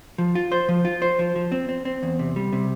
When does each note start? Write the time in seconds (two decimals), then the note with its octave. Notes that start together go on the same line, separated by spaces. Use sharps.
0.18 F3
0.35 F4
0.52 C5
0.69 F3
0.85 F4
1.02 C5
1.19 F3
1.36 F3
1.52 C4
1.69 C4
1.85 C4
2.03 E2
2.19 C3
2.36 G3
2.53 C3